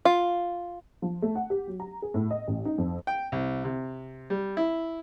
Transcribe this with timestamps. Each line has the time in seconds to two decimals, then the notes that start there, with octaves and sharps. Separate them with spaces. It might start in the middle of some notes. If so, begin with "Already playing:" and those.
0.05 F4
1.02 F3
1.22 A3
1.35 F#5
1.50 G4
1.67 F#3
1.80 A#5
2.02 G#4
2.14 A2
2.30 D#5
2.48 A1
2.65 D#4
2.78 F2
3.07 G5
3.32 C2
3.64 C3
4.30 G3
4.57 E4